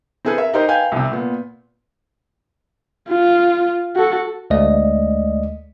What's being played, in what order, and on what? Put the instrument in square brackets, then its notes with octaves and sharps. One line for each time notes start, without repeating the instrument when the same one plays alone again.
[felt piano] C4 E4 G#4 A4 B4
A#4 E5
D#4 G4 A#4 C5 D#5
B4 F5 G5 G#5 G6
C2 C3
A#2 B3
[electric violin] F4
F#4 A4
[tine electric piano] D2 G#3 A3 D5 D#5